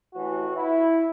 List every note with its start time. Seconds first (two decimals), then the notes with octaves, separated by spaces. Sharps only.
0.14 A1 A2 E3 F#4
0.55 E4